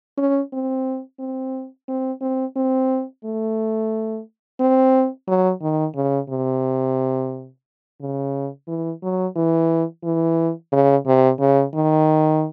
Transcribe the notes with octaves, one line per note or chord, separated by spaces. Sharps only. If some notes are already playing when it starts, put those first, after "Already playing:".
C#4
C4
C4
C4
C4
C4
A3
C4
F#3
D#3
C#3
C3
C#3
E3
F#3
E3
E3
C#3
C3
C#3
D#3